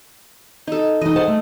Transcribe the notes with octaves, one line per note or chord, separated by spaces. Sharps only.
D#4 A4
E3 D#4 D#5
G#4 C5 F#5 A5
A3